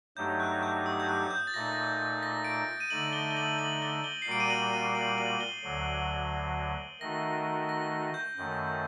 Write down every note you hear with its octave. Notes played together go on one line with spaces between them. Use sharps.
G2 F#3 A3 D#4 G4 G6
F#6
G6
D#6
G6
F#6
G6
A6
A#2 A3 D#4 A#6
A#6
D7
D#7
D3 A3 D#4 F#7
G7
G7
F#7
F#7
G7
G7
C7
A#2 G3 A#3 F#4 A#4 D7
D#7
F#7
D#7
F#7
F#7
G7
D2 D3 F#3
D#3 A3 D#4 F#4 A#6
A#6
G6
F#2 D#3 A3